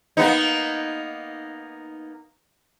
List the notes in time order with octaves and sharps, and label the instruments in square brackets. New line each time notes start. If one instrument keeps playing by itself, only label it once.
[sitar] A#3 B3 D#4